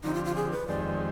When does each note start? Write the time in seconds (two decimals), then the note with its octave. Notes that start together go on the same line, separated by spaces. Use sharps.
0.03 D3 F3 C4 D#4 G4
0.14 F4
0.25 F4
0.35 G#4
0.51 B4
0.68 F2 D#3 G#3 C4 G4 D5